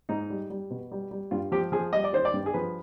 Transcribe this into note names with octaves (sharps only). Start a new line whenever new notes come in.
G#2 D#4
G3
G3
B2
G3
G3
G2 F4
F3 G4
F3 G#4
G3 D#5
D5
D#3 C5
D5
G2
G#4
F3 B4